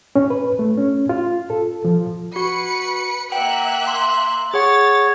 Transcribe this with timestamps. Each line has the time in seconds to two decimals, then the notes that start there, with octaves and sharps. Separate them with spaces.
0.16 C#4
0.30 B4
0.59 A3
0.78 C#4
1.09 F4
1.50 A4
1.85 F3
2.36 F#4 B4 C#7
3.32 A#3 E5 F#5 G5 F#6
3.87 C6
4.54 G#4 C#5 F#5 A6